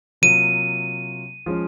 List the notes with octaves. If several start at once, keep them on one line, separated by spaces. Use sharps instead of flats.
C3 F#3 A#3 F4 D#7
F3 G#3 C#4 F4